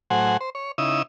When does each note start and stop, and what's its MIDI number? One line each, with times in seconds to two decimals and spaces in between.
0.10 0.37 45
0.10 0.37 54
0.10 0.37 72
0.10 0.37 78
0.10 0.37 80
0.41 0.50 72
0.55 0.72 73
0.78 1.02 49
0.78 1.02 63
0.78 1.02 64
0.78 1.02 87
0.78 1.02 88